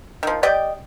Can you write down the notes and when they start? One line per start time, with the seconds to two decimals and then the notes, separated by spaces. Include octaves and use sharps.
0.23 D#3 F3
0.43 G4 D5 D#5 G5